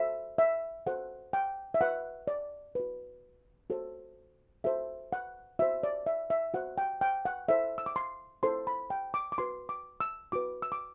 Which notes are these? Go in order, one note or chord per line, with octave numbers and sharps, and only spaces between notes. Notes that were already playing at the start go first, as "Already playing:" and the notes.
Already playing: F#4 A4 C5 E5
E5
F#4 A4 C5 F#5
G5
E5
F#4 B4 F#5
D5
F#4 B4
F#4 A4 C5
F#4 A4 C5 E5
F#5
F#4 C5 E5
D5
E5
E5
F#4 C5 F#5
G5
G5
F#5
E4 A4 C5 E5
E6
D6
C6
E4 A4 C5 C6
B5
G5
D6
D6
F#4 B4 C6
D6
E6
F#4 B4 D6
E6
D6